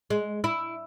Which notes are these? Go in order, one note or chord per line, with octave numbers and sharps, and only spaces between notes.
G#3
E4